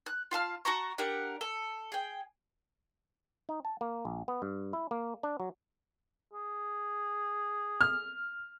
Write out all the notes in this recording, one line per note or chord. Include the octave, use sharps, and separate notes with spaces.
F#6
F4 F5 A5 F6
F#4 A5 A#5 C#6
D4 G4 A#4 F#5
A4
G#4 G5
D#4
A5
A#3
A#1
B3
G2
E4
A#3
D4
F#3
G#4
F6